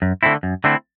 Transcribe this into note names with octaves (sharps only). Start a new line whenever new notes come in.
F#2
D3 A3 C4 E4
F#2
D3 A3 C4 E4